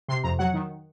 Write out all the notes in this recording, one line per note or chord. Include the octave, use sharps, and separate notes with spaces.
C3 C6
F2 A#5
F#3 F#5
D#3